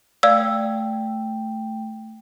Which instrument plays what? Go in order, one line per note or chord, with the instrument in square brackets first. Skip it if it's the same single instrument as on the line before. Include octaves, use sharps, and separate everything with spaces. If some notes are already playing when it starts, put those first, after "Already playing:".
[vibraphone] A3 G5 [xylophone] D5 F5 E6